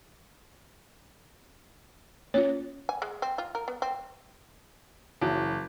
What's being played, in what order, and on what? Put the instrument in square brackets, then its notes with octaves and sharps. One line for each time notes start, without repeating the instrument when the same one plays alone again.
[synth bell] A#3 C#4 F4 [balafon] C#5
[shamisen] G#5
G#3
C4
F4
A#4
B3
C4
[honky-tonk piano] F#1 [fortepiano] E3 F#3